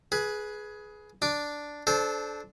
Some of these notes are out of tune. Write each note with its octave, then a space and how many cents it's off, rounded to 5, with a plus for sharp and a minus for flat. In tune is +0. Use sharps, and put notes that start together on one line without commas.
G#4 +15 B4 -10
D4 +0 D6 +0
D4 +0 A4 -25 C5 +0